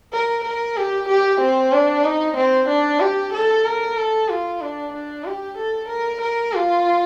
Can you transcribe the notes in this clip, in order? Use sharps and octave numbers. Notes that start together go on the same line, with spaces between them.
A#4
A#4
G4
G4
C4
D4
D#4
C4
D4
G4
A4
A#4
A4
F4
D4
D4
G4
A4
A#4
A#4
F4